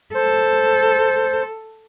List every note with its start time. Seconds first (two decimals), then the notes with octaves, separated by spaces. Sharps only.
0.15 A4 C5